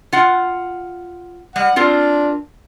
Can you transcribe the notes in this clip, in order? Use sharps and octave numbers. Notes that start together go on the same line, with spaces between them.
F4 F#5
G3 F#5
C4 D4 F4 A#4